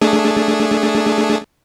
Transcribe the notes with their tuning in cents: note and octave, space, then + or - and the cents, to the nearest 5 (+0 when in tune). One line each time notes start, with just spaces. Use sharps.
A3 +0 D4 +0 G#4 +0